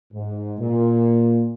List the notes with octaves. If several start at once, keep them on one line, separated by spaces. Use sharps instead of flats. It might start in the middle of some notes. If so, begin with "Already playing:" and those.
G#2
A#2